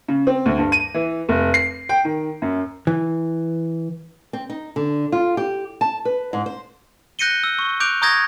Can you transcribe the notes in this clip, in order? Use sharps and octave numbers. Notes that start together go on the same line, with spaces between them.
C#3
C4
D2
G2
D#7
E3
F1
C7
G5
D#3
F#2
E3
C4
D#4
D3
F4
G4
A5
B4
G#2
C5
F#6 G6 A#6 C#7 D#7 G7
E6
C#6
D6 F#6 G6 D7 F7
A#5 C#6 D#6 G6 G#6 A#6